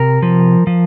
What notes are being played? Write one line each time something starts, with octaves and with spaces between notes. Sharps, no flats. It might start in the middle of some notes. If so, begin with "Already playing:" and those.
Already playing: C3 A#4
F3
F3